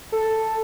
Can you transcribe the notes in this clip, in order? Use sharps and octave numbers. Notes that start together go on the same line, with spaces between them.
A4